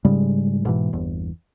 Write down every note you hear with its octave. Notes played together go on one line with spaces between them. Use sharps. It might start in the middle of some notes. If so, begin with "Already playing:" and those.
G#2 C#3 G3 G#3
G#2 B2 E3
G1 E2